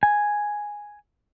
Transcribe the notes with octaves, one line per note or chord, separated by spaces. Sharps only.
G#5